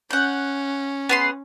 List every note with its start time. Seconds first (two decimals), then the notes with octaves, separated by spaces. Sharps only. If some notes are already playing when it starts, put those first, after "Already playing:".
0.11 C#4 F#5 G6
1.09 B3 G#4 C6